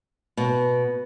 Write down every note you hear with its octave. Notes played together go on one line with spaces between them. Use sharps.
B2